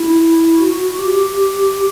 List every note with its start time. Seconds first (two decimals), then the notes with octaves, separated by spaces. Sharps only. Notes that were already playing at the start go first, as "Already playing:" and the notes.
Already playing: E4
0.58 F#4
0.98 G4